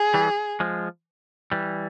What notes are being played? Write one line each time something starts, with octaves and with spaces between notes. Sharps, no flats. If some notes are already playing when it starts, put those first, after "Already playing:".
Already playing: G#4
E3 G3
F3 G#3
E3 G3